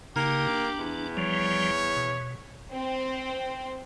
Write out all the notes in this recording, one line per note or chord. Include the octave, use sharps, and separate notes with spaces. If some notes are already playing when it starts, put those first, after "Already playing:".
C#3 A#3 D#4 G4
D4
E2
F3 G3 C#5
B2
C4